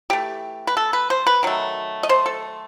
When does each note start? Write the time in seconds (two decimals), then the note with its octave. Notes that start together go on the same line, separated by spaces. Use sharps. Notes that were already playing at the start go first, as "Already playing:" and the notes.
0.10 E3 A3 G4
0.67 B4
0.77 A4
0.93 B4
1.10 C5
1.27 B4
1.43 D#3 F#3 A3
2.03 D#5
2.09 C5
2.26 A4